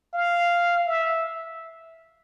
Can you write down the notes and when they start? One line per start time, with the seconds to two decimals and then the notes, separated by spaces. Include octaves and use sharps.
0.14 F5
0.87 E5